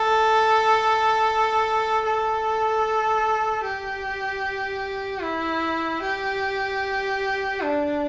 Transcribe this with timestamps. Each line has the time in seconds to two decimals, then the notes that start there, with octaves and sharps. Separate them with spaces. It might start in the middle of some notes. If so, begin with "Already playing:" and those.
Already playing: A4
2.05 A4
3.64 G4
5.23 E4
6.02 G4
7.61 D4